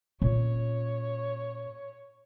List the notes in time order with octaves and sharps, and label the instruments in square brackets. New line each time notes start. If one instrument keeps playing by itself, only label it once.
[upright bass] A#2 C#4 [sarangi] C#5